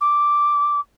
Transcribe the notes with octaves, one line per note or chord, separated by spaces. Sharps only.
D6